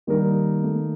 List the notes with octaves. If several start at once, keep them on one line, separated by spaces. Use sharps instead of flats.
D#3 G3 A#3 D#4 A#4
A3